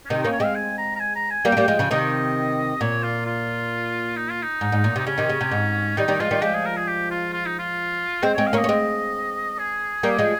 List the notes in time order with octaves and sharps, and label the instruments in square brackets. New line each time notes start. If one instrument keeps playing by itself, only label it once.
[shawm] C#4
[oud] C3 D#3 [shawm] D#4
[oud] A#3 C#4 [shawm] D#4
[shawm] C#5
[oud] G#3 C4 [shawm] F5
[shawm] G#5
A#5
A#5
G#5
A#5
G#5
[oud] G3 A#3 [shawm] G5
[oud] C4
G3 A#3
F3 G#3
C#3 F3
[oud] C3 D#3 [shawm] D#5
[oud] A#2 [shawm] C#5
[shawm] F4
F4
D#4
F4
D#4
[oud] G#2
G#2
A#2
[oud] C3 [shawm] D#4
[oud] C#3 [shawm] C#4
[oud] C3 D#3
C#3
C3
G#2
[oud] D#3 G3 [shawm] D#4
[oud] D#3 G3
[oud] F3 G#3 [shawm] F4
[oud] D#3 G3
[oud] F3 G#3 [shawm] G4
[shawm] G#4
A#4
G#4
G4
F4
F4
D#4
F4
[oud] G#3 C4 [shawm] C5
[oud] G#3 C4 [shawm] C#5
[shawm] F5
[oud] A#3 C#4 [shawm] D#5
[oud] C#4
G#3 C4
[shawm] G#4
[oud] G3 A#3
F3 G#3